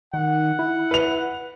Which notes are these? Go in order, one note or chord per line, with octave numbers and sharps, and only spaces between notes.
D#3 F#5
E4
B4 F7